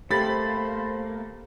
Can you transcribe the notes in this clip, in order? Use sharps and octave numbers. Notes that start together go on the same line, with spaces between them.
A3 A#3 G4 A4 C5 B5 A6